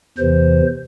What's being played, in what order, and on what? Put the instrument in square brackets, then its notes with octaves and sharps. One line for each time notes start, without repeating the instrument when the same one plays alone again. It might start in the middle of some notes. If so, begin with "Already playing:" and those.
[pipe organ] E2 C3 E3 C5